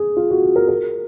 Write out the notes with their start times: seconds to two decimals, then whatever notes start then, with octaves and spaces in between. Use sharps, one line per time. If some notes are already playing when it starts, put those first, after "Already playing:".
Already playing: G#4
0.17 F4
0.30 F#4
0.43 G#4
0.56 A#4
0.68 A#4